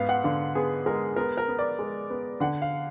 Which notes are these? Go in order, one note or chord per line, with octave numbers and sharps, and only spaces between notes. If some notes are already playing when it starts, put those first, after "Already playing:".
Already playing: G#2 B3 F5
F#5
D3 F5
B3 G#4
G#3 A#4
B3 A#4
A#4
B3
D5
G#3
B3
D3 F#5
F5